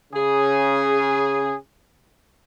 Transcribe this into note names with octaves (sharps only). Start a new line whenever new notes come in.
C#3 G#4